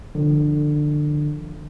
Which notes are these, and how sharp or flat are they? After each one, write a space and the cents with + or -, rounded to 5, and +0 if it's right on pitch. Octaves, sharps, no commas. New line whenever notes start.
D3 +20 F3 +0